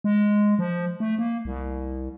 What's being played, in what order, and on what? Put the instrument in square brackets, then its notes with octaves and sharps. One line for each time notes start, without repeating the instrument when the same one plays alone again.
[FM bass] G#3
F3
A3
A#3
C2